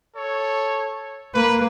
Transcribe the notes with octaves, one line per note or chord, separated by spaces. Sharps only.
A4 C#5
A#3 B4